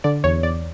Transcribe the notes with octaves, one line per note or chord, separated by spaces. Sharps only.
D3 D5
E2 C#5
E2 D5